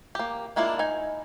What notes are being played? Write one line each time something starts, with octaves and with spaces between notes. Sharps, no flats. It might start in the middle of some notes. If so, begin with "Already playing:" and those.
A#3 G4
G#3 A#3 D4 E4 F4
D#4 G#5